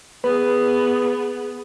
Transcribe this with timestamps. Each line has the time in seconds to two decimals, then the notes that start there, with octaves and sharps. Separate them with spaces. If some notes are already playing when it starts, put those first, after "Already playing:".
0.24 B3 G#4 B4